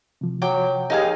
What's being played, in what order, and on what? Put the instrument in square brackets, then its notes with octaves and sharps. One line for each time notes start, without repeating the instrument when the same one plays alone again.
[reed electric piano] C3 F3
[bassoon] F#3 [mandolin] G5 D6
[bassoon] D#2 [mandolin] D#4 F5 G#5 [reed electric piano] G4 G#4